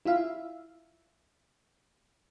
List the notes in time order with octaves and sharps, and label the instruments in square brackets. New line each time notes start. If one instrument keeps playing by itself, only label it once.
[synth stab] E4 F4 E5 F5